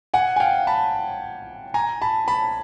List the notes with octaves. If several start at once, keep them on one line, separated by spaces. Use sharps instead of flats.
F#5 G#5
G#5
F5 G5
A5 B5
G#5 A#5
A5 B5
A5 B5